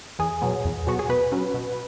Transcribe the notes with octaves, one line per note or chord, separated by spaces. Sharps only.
E2 G#4
B2 F#3 B3
E2
B2 F#3 B3 F#4
G#4
B2 B4
F#3 C#4
B2